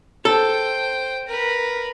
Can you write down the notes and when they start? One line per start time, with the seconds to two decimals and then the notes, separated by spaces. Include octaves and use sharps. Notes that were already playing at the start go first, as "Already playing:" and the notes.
0.25 A4 C5 G5
1.27 A#4 B4